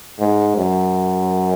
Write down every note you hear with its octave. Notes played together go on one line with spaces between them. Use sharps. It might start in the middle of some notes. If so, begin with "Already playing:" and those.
G#2
F#2